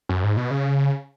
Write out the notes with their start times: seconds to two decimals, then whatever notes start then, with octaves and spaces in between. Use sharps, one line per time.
0.09 F#2
0.24 G#2
0.37 B2
0.51 C#3